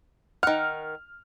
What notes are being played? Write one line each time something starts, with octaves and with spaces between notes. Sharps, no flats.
D#3 F#5 F6